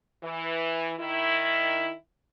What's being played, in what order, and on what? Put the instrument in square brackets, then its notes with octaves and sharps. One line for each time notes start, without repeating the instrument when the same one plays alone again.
[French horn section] E3
D#3 E4